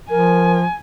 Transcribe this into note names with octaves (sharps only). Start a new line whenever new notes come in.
F3 A#4 G#5